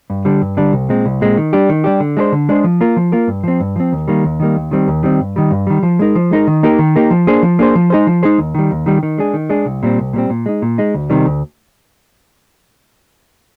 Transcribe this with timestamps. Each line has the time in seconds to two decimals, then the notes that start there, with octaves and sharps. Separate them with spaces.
0.10 G2
0.25 D3 G3 D4
0.41 G2
0.57 D3 G3 D4
0.72 C2
0.89 A#2 G#3 C4
1.05 C2
1.21 A#2 G#3 C4
1.37 D#3
1.53 G3 D4 G4
1.69 D#3
1.84 G3 D4 G4
2.00 D3
2.17 G#3 D4 G#4 C5
2.32 D3
2.49 G#3 D4 G#4 C5
2.64 F3
2.81 A#3 F4 A#4
2.96 F3
3.12 A#3 F4 A#4
3.28 G2
3.44 F3 C4
3.60 G2
3.76 F3 C4
3.92 D#2
4.08 D#3 G3 A#3
4.24 D#2
4.40 D#3 G3 A#3
4.56 D#2
4.71 D#3 G3 C4
4.88 D#2
5.03 D#3 G3 C4
5.20 G2
5.36 D#3 G3
5.51 G2
5.67 D#3 G3
5.83 F3
5.99 G#3 D#4 A#4
6.15 F3
6.31 G#3 D#4 A#4
6.47 D#3
6.63 A#3 D#4 G4 A#4
6.79 D#3
6.96 A#3 D#4 G4 A#4
7.10 F3
7.27 A#3 D4 G#4 C5
7.43 F3
7.59 A#3 D4 G#4 C5
7.75 F3
7.90 G#3 D#4 G#4 C5
8.07 F3
8.23 G#3 D#4 G#4 C5
8.38 D#2
8.55 D#3 G3
8.71 D#2
8.86 D#3 G3
9.03 D#3
9.18 G#3 D4 G#4
9.34 D#3
9.49 G#3 D4 G#4
9.66 C2
9.83 A#2 G3 C4
9.98 C2
10.13 A#2 G3 C4
10.30 A#2
10.46 G#3 D#4
10.62 A#2
10.78 G#3 D#4
10.94 D2
11.10 C3 D#3 G3
11.26 D2